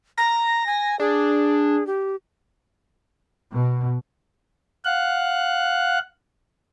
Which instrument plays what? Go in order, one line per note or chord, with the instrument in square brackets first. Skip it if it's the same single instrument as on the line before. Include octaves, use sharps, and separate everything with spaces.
[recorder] A#5 [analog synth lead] A#6
[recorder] G#5
[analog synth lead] D4 [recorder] G#4
[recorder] G4
[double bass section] B2
[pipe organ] F5 F#5 F#6